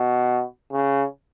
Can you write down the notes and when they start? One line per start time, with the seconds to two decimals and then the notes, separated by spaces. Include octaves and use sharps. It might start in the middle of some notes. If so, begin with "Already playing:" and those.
Already playing: B2
0.72 C#3